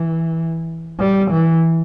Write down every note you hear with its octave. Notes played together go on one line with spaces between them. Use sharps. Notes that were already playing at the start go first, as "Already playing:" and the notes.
Already playing: E3
G3
E3